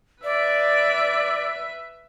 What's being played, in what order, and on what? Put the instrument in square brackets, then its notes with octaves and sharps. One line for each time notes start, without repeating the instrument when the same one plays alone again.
[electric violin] B4 E5 [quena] D5